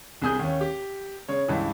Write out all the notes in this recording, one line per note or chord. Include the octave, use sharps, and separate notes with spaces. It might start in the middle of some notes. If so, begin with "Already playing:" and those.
C2 C3 G#4 D#6 G6
D#2 C#4
G4
C#3 C#5
C#2 G2 E3